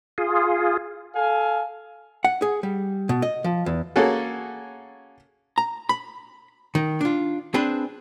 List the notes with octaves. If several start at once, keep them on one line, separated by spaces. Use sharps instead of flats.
F4 G#4
A4 F5 G#5
F#5
G#4
G3
B2
D#5
F3
E2
A#3 C#4 F#4 G#4 A4
A#5
B5
D#3
D4 F4
C4 D4 G#4 B4